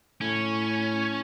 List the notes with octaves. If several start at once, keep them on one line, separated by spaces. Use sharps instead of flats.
A2 C#4